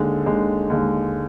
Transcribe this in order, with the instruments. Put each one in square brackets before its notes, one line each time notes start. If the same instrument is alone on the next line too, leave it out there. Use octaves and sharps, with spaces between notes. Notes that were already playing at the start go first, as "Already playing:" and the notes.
Already playing: [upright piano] D#2 D3 G#3
D#2 D3 G#3
D#2 D3 G#3